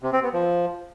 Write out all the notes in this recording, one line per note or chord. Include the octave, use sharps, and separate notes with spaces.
C3
C4
B3
F3